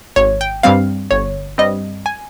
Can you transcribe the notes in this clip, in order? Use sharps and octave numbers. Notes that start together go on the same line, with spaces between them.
G#1 C#5
G5
G2 G3 C4 F5
G1 C#5
G2 G3 C4 D#5
G#5